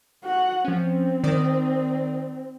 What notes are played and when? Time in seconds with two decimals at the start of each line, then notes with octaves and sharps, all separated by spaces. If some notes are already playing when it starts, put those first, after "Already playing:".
0.23 F#4 F#5
0.65 F3 C4 C#4
1.24 D#3 D5 D#6